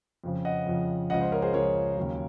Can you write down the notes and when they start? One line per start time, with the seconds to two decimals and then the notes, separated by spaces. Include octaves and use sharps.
0.24 F2 C#3 F3
0.45 D#5 F#5
0.66 F2 C#3 F3
1.10 C#2 C#3 F3 D#5 F#5
1.21 C5 D#5
1.32 A#4 C#5
1.42 G#4 C5
1.53 C#2 C#3 F3 A#4 C#5
1.97 D#2 C#3 F#3